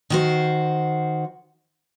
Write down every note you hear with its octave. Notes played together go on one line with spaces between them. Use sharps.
D#3 F#4 C5